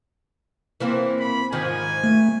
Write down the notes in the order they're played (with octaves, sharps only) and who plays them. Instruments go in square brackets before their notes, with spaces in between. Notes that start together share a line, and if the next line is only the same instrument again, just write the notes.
[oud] E3 A#3 C4
[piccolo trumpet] B5
[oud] G#2 D#3 F3 [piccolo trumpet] G#5
[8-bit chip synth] A3